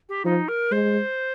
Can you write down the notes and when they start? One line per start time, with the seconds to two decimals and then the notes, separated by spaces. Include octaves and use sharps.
0.09 G4
0.25 F3 D#4
0.48 A#4
0.72 G#3 C5